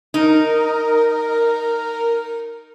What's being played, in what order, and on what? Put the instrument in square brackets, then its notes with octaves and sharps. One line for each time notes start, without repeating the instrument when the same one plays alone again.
[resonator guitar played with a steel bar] D#4 [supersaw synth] A#4